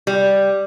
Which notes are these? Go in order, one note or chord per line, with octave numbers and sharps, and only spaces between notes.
G3